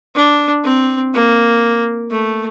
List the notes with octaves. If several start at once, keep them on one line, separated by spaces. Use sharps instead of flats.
D4
C4
A#3
A3